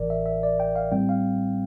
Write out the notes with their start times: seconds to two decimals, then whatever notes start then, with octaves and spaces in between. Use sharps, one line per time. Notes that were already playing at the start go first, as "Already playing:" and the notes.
Already playing: A1 A2 E3 A#4 D5
0.10 E5
0.26 E5
0.43 D5
0.60 G5
0.76 F5
0.92 A2 G3 C4 G5
1.09 F5